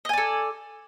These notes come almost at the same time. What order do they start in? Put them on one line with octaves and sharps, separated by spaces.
D#5 G#5 D5 A4